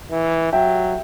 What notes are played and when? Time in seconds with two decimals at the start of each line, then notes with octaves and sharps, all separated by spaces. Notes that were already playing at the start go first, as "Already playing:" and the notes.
0.11 E3
0.53 F#3 E5 G5